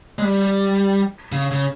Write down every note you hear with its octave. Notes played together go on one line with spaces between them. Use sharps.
G#3
G3
C#3
C#3